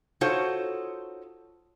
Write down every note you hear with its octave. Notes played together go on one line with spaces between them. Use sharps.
D#4 F4 F#4 A4 C5 C#5